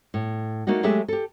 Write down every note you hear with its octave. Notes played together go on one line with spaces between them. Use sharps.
A2
A3 A#3 D4 D#4 F#4
F#3 G#3 A3 G4 G#4 E5
G4 A4